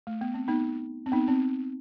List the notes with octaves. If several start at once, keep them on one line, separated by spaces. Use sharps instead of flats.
A3
B3
C4
B3 D#4
C4
B3 D#4
C4